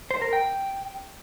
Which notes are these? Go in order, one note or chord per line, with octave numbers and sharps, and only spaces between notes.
C5
A#4
G5